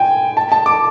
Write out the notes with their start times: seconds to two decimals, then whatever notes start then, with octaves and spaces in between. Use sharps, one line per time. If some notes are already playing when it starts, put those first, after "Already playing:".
Already playing: G5 G#5
0.37 A5
0.52 A5
0.66 D6